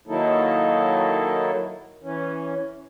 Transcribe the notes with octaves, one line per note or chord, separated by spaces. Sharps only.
D#3 F#3 A#3 D#4 E4 A4
E3 C#4